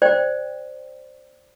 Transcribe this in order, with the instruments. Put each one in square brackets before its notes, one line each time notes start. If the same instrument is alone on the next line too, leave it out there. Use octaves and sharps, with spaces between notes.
[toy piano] C5 D5 G5